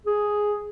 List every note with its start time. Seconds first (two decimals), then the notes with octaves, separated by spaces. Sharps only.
0.06 G#4